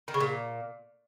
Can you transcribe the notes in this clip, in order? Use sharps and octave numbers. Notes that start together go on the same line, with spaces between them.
D#3
C#3
A#2